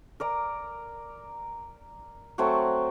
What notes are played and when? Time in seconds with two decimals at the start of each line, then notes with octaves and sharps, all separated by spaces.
0.20 A#4 D5 A#5
2.38 F#3 A3 C4 F#4